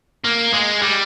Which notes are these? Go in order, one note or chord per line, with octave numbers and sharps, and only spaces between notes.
A#3
G#3
G3